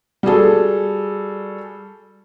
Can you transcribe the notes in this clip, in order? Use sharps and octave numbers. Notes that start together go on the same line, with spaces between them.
G3 F#4 G#4 A4